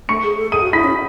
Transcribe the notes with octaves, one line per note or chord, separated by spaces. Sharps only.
A3 C#6 C#7
G#4
A4
G#4 D#6 D#7
F#4
E4 B5 B6
C#4